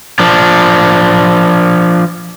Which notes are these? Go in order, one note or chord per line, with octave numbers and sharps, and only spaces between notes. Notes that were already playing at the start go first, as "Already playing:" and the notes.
F3 D4